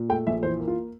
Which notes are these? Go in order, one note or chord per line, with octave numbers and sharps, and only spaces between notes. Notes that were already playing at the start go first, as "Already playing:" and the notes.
Already playing: A#2
A3 G5
A#1 E5
E3 C5
A#3
F4